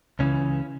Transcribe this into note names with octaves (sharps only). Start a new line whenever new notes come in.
C#2 C#3 E3 C#4